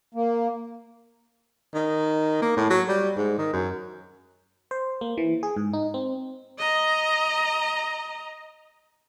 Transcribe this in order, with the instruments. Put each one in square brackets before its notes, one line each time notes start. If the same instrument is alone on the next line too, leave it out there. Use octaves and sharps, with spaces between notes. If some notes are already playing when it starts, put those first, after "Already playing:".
[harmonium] A#3
[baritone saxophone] D#3
A#3
A2
F#3
G3
G#2
D#3
F#2
[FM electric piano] C5
A#3
E3
G#4
G#2
D#4
C4
[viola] D#5 A#5